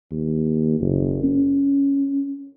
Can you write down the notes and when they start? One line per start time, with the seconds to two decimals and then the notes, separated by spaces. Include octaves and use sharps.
0.11 D#2
0.80 F#1
1.24 C#4